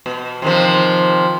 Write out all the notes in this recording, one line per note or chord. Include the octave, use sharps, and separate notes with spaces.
B2
C3 D#3 F3